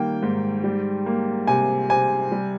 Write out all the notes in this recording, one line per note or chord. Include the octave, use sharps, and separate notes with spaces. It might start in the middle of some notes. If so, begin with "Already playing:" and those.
Already playing: D#3 G3 A#3 G5
G#2
G3
A#3
C3 G#5
C3 G#5
G3